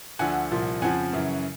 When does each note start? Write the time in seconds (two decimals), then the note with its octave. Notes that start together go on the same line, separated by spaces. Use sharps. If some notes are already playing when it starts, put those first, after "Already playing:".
0.19 D2 D3 F3 F#5 G#5
0.51 C2 A#2 F3
0.82 F2 C#3 F3 F#5 G#5
1.13 F#2 C#3 E3